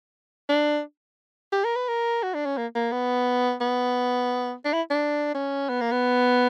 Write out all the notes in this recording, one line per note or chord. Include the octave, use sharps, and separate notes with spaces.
D4
G4
A#4
B4
A#4
F#4
D4
C#4
A#3
A#3
B3
B3
D4
E4
D4
C#4
B3
A#3
B3